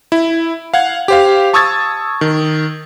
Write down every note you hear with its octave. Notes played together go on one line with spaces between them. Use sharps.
E4
F5 F#5 G#6
G4 C5 F5
A5 C#6 D#6 E6 G#6 A6
D#3